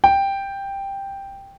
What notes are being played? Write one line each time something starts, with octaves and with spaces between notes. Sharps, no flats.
G5